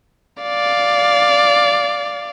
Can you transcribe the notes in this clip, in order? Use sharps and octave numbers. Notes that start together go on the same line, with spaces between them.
D5 F5